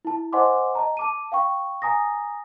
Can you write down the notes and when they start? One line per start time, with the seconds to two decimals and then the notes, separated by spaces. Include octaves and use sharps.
0.05 E4 A5
0.33 C5 D#5 F#5 G#5 C6 D6
0.75 D#5 A5 A#5
0.97 A5 D6 D#7
1.32 F5 G5 C#6
1.82 G#5 A#5 D#6 A#6